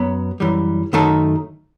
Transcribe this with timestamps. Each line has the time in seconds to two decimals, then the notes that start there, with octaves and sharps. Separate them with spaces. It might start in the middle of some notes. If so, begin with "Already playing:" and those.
Already playing: F#2 F#3 B3
0.40 F#2 E3 G3
0.93 F#2 D#3 A3 D#4 A4